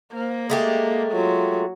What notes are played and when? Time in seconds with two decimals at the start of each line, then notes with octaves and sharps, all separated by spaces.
0.12 A#3 C5
0.50 G#3 A3 G4 G#4
1.12 F#3 F4